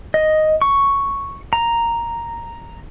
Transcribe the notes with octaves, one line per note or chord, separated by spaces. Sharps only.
D#5
C#6
A#5